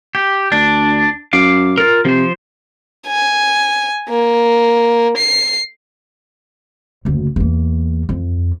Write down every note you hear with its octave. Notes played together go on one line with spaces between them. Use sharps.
G4
D2 D4
F#2 F5 D6
F4 A#4
C3 F3 C5
G#5
A#3
C7
F#1 D2
E2 A#3
F2